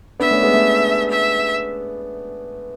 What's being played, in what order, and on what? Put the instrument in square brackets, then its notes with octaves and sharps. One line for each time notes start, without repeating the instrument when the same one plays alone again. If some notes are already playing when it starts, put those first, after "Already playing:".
[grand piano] B3 D4 [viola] E5
[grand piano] A3 C#4
G#3 B3
A3
[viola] E5